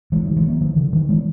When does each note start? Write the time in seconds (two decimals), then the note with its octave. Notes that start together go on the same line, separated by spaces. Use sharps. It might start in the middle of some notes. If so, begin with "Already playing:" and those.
0.12 E3 G#3
0.24 D#3 F#3
0.36 E3 G#3
0.48 F#3 A#3
0.61 D#3 F#3
0.76 C#3 E3
0.93 D#3 F#3
1.09 E3 G#3